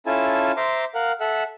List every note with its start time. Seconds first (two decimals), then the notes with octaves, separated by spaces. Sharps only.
0.06 C#4 E4 F4 A4 G#5 A5
0.57 C5 E5 A#5 C6 D6
0.95 A#4 F5 F#5
1.20 A4 E5 F#5